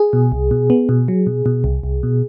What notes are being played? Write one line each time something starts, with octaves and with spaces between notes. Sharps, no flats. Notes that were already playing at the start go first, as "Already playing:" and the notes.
Already playing: G#4
B2
C2
B2
B3
B2
F#3
B2
B2
C2
C2
B2